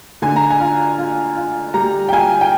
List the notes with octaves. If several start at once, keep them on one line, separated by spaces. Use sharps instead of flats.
D3 G#5
A#5
G#5
F4
F4
F4
G3 A#5
G5
F4 G#5
G5